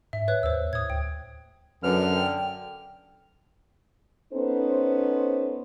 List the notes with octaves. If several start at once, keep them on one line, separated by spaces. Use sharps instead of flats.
G#2 E5
B4 C#5 F#6
D#2 C5 E6
A2 D#6 G#6
D2 G5
F#2 D3 B4 F6
G5
B3 C#4 D#4 A4 C5